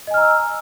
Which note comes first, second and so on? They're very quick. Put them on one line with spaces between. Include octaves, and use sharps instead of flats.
D#5 G#5 F6 A#5 E6